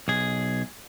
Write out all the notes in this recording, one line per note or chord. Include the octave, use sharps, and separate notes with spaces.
B1 G#4